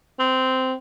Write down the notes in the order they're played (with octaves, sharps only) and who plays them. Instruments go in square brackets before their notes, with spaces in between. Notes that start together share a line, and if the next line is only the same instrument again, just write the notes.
[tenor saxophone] C4